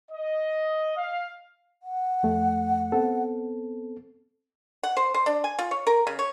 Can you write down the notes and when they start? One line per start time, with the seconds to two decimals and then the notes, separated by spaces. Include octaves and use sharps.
0.11 D#5
0.97 F5
1.83 F#5
2.23 F2 A3
2.92 B3 C4 A4
4.83 F#5
4.97 C5
5.14 C5
5.26 D4
5.44 G#5
5.59 F4
5.71 C#5
5.87 A#4
6.07 C#3
6.19 C#5